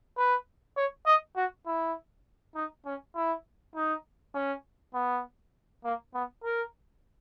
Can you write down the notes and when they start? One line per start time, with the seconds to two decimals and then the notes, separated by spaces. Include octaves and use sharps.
0.18 B4
0.77 C#5
1.06 D#5
1.36 F#4
1.66 E4
2.55 D#4
2.86 C#4
3.15 E4
3.75 D#4
4.35 C#4
4.94 B3
5.84 A#3
6.14 B3
6.44 A#4